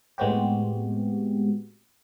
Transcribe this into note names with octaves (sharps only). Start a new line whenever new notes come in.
A2 G#3 B3 C4 F#4 G4